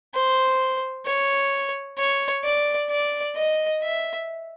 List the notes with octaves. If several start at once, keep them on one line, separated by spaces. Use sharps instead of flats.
C5
C#5
C#5
D5
D5
D#5
E5